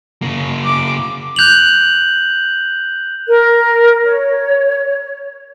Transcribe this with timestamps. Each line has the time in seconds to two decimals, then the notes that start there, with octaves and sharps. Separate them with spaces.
0.22 C#3 A#3
0.65 D6
1.36 F#6 G6 F7 F#7
3.28 A#4
4.05 C#5